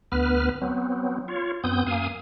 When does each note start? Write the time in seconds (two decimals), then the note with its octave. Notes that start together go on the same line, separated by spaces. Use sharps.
0.12 D2 B3 B4 F6
0.61 F#3 B3 C4
1.28 F4 C#5
1.64 F#2 B3 C4 D#6 G6
1.87 F#2 A#3 F5 G#5 D#6